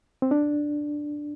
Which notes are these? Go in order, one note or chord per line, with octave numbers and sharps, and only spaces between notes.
C4
D4